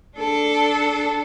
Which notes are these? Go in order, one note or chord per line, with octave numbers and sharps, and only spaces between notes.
D4 A4